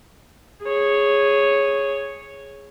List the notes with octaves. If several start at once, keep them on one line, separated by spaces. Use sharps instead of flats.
G#4 C#5